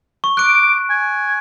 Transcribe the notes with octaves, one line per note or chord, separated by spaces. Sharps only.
C#6
D6 F#6 D7
G#5